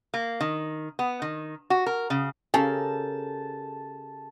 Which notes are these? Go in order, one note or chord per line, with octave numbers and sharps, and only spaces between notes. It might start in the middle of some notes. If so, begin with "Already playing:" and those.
A#3
D#3
B3
D#3
F#4
A#4
C#3
C#3 G4 A4 A#4 A5